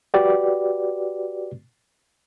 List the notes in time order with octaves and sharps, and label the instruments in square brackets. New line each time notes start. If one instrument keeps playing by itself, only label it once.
[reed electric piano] F#4 G4 B4 D5